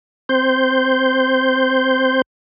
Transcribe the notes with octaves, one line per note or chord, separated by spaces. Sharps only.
C4 C5 G6